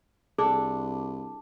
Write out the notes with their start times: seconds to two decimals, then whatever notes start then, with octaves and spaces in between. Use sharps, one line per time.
0.39 C2 D4 G#4 A4 A5 D6